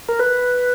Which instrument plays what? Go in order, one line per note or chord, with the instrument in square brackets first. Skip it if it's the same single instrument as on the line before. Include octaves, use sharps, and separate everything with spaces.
[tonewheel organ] A#4
B4